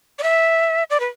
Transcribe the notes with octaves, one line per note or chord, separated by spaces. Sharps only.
D5
E5
D5
B4